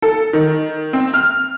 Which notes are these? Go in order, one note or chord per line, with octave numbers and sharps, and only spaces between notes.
A4
D#3
C4
F6